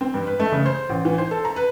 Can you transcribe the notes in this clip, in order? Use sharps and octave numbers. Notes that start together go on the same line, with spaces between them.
C4
G2
B4
A3
C#3
C5
A1
E3
C5
A4
A#5
B4